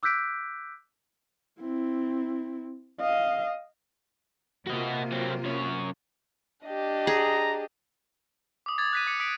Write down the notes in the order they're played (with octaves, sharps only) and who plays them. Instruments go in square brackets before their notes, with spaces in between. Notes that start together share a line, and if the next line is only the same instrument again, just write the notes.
[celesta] D6 E6 F#6 G6 B6 D7
[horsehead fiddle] C4 E4
D#5 F5
[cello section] C3 A#3 F4 [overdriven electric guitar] F#4 D#5
[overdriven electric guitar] F#3 C4
F#2 C#5
[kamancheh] D4 G4 [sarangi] D#5
[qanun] G#4 [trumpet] A#5
[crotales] D6 D#6
D6 G#6 A6
F#6 B6 D#7
D6 C#7
D#6 B6 D7